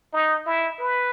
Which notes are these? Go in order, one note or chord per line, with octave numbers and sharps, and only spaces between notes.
D#4
E4
B4